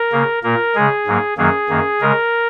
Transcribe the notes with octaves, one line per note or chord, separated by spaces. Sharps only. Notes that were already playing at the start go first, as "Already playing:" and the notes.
Already playing: A#4
C#3 A#3
A#2 A#3 A#4
C#3 G#3 G#4
G#2 F#3 A#3
F#2 D#3 F#3 A#3 G#4
F#2 D#3 A#3
C#3 G#3 A#4